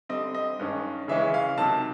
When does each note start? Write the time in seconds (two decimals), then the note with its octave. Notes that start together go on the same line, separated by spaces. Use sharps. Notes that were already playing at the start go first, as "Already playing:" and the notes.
0.09 D3 G3 C4 D#5
0.35 D#5
0.59 G2 D#3 G#3 C#4
1.08 C#3 E3 G#3 C#4 E5
1.34 F5
1.58 C3 D#3 F#3 A5